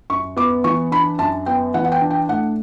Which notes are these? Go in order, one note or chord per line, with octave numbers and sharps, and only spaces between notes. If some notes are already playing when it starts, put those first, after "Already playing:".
F#2 C#6
B3 D6
E3 C#6
D4 B5
F#2 A5
B3 G5
E3 F#5
F#5
G5
D4
G5
A2 F#5